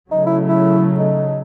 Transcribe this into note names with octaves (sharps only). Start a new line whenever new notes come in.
C#3 F#3 A3 D#4
E4
E4
D#4